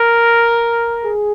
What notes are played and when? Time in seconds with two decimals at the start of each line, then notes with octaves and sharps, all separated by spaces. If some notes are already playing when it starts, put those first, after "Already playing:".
Already playing: A#4
1.04 G#4